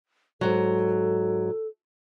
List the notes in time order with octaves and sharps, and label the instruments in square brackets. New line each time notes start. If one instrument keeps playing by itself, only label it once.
[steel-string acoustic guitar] G#2 F#3 [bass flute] A4